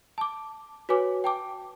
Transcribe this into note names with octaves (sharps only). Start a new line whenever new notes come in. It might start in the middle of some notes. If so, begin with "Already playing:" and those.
A5 D6
F#4 B4 C#5 G#5 D6
G5 A5 D6